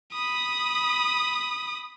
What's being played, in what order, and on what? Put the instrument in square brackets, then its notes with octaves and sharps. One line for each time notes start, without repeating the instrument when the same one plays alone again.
[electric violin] B5 D#6